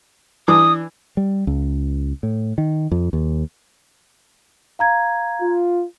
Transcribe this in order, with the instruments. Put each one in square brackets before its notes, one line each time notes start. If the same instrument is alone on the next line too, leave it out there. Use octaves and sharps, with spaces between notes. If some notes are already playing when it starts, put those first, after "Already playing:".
[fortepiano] E3 D4 D6 [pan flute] D#6
[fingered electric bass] G3
C#2
A2
D#3
F2
D#2
[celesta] F5 A#5 G#6
[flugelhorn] F4